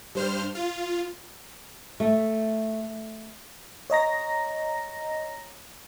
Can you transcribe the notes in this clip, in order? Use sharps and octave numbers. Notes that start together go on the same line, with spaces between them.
G2 C5 F6
F4
A3
C#5 D#5 A#5 A#6